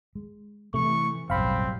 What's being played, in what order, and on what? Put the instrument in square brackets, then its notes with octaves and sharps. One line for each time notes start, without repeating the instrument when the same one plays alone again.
[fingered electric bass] G#3
[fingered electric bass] C3 [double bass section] E3 [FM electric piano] A3 [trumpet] C#6
[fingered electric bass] F#1 B1 [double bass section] A2 F#3 G3 [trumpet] C4 [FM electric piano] F5 B5